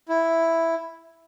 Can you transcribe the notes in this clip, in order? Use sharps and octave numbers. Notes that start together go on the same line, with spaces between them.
E4